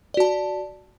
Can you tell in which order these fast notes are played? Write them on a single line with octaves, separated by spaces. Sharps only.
D5 F#4 A5